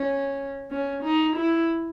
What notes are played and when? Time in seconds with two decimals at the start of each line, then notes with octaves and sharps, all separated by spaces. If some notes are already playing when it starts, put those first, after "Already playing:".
Already playing: C#4
0.71 C#4
1.03 D#4
1.36 E4